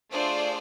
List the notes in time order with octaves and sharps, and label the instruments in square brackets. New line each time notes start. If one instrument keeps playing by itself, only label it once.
[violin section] A3 D4 F4 G#4 C5 D5